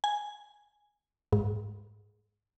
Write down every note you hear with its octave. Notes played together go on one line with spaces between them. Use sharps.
G#5
G#2